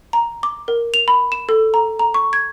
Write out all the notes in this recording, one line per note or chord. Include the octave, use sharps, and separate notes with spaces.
A#5
D6
A#4
F7
B5
E7
A4
A#5
A#5
C#6
G#6